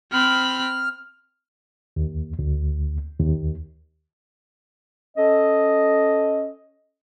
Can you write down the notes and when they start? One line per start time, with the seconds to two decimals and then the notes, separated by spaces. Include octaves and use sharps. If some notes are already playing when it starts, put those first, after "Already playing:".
0.12 C4 B5 F6
1.96 D#2
2.39 D2
3.20 D#2
5.17 C#4 A4 D#5